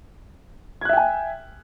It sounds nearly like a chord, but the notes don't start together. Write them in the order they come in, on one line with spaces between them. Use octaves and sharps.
G#6 F#6 E5 G5 G#5